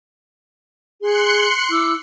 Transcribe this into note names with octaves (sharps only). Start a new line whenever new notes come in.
G#4 C6 F#6 C#7
E4 D6 E6